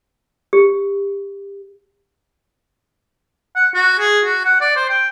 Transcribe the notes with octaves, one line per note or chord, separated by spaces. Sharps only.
G4
F#5
F#4
G#4
F#4
F#5
D5
C5
G5